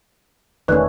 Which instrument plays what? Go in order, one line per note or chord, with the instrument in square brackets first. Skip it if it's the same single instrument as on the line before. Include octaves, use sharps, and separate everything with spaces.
[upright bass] E1 D2 [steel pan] D#3 A3 C#4 [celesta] B4 D5 F#6